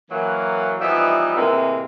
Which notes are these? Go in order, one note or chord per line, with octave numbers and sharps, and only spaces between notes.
E3 F#3 A#3
E3 F3 G3 B3 D#4 E5
A2 C3 E3 G#3 A#3